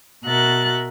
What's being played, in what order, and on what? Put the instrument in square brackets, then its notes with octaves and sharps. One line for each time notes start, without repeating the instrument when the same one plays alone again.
[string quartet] B2 F#4 A#4 E5 F#6 A6